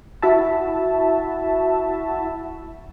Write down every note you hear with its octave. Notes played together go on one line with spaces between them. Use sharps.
E4 F#4 E5 A5